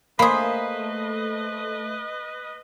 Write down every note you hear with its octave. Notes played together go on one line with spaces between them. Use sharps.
A3 A#3 G#4 B4 C5 D#5 B5